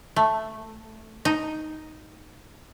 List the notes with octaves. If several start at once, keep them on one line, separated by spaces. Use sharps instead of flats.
A3
D#4